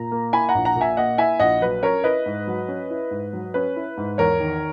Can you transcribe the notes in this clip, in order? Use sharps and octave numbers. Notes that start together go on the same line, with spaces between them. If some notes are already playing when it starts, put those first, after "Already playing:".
Already playing: A#2 A#5
A#3
E4 G#5 B5
F#5 A#5
A#1
F#5 A#5
A#2
E5 G#5
A#3 D#5 F#5
E4 E5 G#5
A#1 D#5 F#5
F#3 B4
C#4 A#4 C#5
E4 B4 D#5
G#2
F#3
C#4
E4
G#2
F#3
C#4 B4
E4
G#2
E2 A#4 C#5
D#3